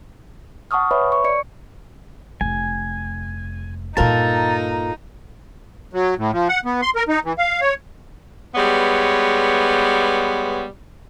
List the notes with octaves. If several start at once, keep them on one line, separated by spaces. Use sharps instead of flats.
F#5 A5 C#6 D#6 F6
B4 C#5 E5 B5
C#6
D5 C#7
F1 G#5
G2 A#2 D#4 F4 A4 A#4 A5
F#3
A2
F3
F#5
B3
C6
A#4
D#4
E3
F5
C#5
G3 G#3 B3 B4 C#5